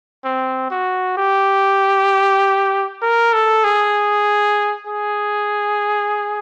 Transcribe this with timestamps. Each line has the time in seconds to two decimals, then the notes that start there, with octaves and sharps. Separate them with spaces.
0.25 C4
0.71 F#4
1.18 G4
3.02 A#4
3.33 A4
3.64 G#4
4.87 G#4